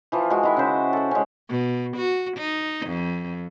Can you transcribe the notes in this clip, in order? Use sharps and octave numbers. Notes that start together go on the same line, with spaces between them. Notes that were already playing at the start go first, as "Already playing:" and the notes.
E3 F3
G#3 F#4
D#3 E4 E5
C#3 C5
A4 F#5
G#3 C#4
B2
F#4
D#4
F2